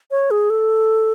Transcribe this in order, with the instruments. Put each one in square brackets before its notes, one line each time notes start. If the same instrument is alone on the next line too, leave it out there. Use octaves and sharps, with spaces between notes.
[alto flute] C#5
G#4
A4